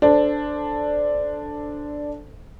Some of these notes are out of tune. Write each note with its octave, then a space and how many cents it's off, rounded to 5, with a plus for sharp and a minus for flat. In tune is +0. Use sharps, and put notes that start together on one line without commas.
D4 +0 A4 +0 C5 -15